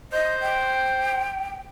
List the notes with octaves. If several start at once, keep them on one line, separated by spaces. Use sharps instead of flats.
C5 D#5
G5